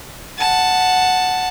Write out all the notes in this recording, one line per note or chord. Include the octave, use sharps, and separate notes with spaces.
F#5 A5